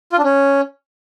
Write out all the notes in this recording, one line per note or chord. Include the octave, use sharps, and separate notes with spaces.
F4
D4
C#4